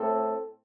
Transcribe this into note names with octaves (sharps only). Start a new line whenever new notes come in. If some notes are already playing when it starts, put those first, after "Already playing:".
Already playing: A2 A3 C4 A4